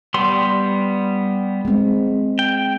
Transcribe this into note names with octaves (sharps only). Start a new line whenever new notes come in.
G3 B3 C6
G#3 C4
G5